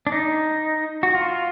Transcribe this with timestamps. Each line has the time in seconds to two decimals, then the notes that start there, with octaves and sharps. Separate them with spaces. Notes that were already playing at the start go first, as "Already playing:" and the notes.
0.07 D4
0.12 D#4
1.03 F#4
1.15 F4